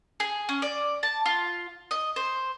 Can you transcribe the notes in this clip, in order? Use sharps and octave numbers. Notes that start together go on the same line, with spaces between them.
G#4
C#4
D5
A5
F4
D#5
C5